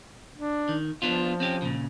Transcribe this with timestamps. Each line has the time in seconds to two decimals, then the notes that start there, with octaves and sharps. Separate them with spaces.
0.36 D4
0.69 D#3
1.02 F3 B3 D4 F4
1.40 C4 C#4 G4
1.62 A#2 C#3